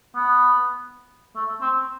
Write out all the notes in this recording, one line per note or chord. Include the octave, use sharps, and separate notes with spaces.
B3
A3
C4